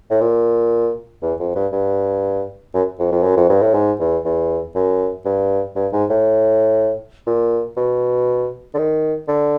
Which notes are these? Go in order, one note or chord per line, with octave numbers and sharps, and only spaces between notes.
A2
A#2
E2
F2
G2
G2
F#2
F2
F2
F#2
F2
G2
A2
G#2
E2
E2
F#2
G2
G2
G#2
A2
A#2
B2
D3
D#3
D3